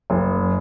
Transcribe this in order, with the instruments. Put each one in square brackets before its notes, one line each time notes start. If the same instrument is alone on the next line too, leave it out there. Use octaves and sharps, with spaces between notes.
[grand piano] F#1